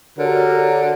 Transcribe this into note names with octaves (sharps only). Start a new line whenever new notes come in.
D3 F#4 G4 A#4 C#5 D5